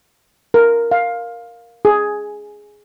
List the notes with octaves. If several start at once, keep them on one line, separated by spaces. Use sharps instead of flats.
A#4
F5
G#4